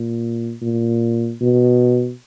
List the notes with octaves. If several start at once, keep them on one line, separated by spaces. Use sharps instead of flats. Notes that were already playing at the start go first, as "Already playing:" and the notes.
Already playing: A#2
A#2
B2